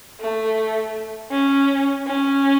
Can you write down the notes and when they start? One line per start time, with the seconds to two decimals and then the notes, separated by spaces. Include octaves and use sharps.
0.20 A3
1.31 C#4
2.07 C#4